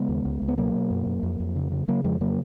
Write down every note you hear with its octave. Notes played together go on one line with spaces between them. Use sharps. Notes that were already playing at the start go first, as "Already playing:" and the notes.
Already playing: C#3 G#3 B3
D#2
C#2
C#2
B3
B2 F#3 A#3
B2
F#2
F#2
F2
F2
C#3
C#3
C#3 F#3 A#3
F2 F3 G#3
C#3 F#3 A#3